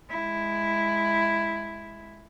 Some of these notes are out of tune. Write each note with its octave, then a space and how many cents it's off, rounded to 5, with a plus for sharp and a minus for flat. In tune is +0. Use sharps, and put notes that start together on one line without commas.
G#3 +0 E4 +5